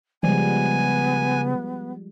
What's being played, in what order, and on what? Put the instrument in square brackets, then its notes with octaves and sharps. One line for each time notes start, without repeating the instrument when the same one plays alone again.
[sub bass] C#3 [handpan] F3 G3 G#3 [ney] B3 [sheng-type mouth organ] G#5